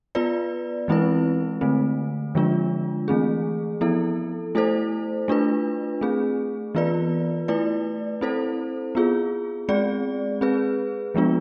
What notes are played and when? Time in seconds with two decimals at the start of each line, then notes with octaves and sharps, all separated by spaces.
0.15 B3 F4 B4 D5
0.88 E3 G#3 C4 E4 B4
1.61 D3 A3 C4
2.35 D3 F3 G#3 D4 F4
3.08 E3 A3 C4 G#4
3.81 F3 B3 E4 A4
4.55 A3 E4 A4 C5
5.28 A3 D4 F4 B4
6.01 A3 C4 G#4
6.75 E3 B3 F4 B4 D5
7.48 A3 E4 B4 D5
8.21 C4 E4 A4 C5
8.95 B3 F4 G#4
9.69 G#3 C4 G#4 D5
10.41 C4 G#4 B4
11.15 F3 G#3 B3 D4 F4